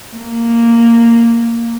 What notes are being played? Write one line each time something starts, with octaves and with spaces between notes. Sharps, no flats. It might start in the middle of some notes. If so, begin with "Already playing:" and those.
A#3